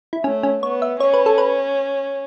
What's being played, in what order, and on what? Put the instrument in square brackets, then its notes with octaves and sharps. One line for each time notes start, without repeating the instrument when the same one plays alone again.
[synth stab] E4
[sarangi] A3 [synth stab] C#4
[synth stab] C#4
[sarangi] B3 [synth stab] C#5
[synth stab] E5
[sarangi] C#4 [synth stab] C#5
[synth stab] B4
A4
B4